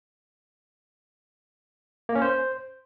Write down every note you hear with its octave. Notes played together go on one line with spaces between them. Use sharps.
A#3
C#4
C5